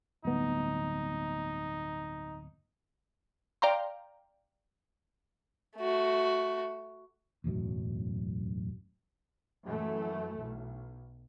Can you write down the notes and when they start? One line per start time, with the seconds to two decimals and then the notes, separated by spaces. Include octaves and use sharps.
0.25 D1 G1 B3 D#4
3.62 D5 F5 G5 A#5 C6
5.76 A3 F#4
7.44 E1 A1 F#2 F#3
9.67 F#2 E3 A3
10.40 B1